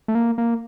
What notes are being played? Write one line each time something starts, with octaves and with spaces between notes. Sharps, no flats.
A3
A#3
A#3